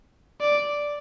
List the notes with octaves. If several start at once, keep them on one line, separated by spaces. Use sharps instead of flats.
D5